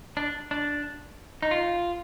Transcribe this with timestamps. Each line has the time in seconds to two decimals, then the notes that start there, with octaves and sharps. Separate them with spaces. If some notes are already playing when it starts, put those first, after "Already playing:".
0.17 D4
0.51 D4
1.42 D#4
1.51 F4